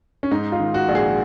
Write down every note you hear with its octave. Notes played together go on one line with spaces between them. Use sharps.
C#4
G#2 D#4
F4
D#3
F#4
A#1
G#4